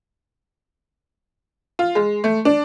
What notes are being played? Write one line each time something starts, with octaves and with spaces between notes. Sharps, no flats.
F4
G#3
A3
D4